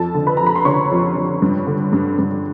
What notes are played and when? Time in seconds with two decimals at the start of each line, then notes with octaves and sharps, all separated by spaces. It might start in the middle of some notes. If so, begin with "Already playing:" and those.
Already playing: F2 A4 A5
0.14 D3
0.27 B4 B5
0.37 F2 A#5
0.47 B5
0.56 C6
0.65 D3 C#5 C#6
0.91 F2
1.17 F2
1.42 G2
1.67 D3
1.93 G2
2.19 G2